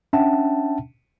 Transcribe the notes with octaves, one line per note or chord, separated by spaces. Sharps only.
C#4 D4 E5 F#5 G5 A5